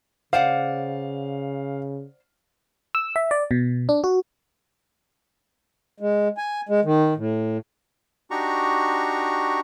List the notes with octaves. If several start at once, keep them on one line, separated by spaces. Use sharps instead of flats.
C#3 C5 D5 F5 F#5
E6
E5
D5
B2
D4
F#4
G#3
G#5
G#3
D#3
A2
D4 D#4 F#4 G4 A#5 C#6